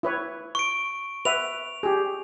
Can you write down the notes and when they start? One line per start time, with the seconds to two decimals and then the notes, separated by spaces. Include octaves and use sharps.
0.03 E4 B4 C#5
0.55 C#6 D7
1.25 B4 E5 F#5 F7
1.83 G4 G#4